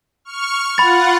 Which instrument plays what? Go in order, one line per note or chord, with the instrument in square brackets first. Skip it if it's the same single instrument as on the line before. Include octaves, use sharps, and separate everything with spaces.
[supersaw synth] C#6 F6
[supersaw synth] F4 F#5 [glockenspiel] B5 A6